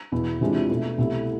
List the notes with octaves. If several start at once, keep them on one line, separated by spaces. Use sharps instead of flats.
E2 B2 B3 E4
C3 E3 G#3 D4 F4
B2 A3 D4
C2 B2 A3 E4